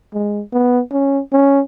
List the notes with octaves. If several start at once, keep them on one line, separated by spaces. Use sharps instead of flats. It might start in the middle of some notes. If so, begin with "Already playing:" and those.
G#3
B3
C#4
C#4